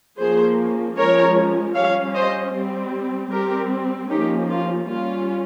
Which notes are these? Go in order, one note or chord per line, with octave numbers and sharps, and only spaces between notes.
F3 A#3 C#4 G#4 C5
F3 G#3 C#4 A#4 C#5
G3 C#4 C#5 F5
C5 D#5
G3 C4
G3 C4 G4 A#4
F3 A#3 C#4 D#4 G4
F4
G3 C#4 F4